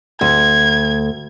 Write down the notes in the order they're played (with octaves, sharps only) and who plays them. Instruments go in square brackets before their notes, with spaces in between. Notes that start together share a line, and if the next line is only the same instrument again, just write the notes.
[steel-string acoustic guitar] D2 [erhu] G#6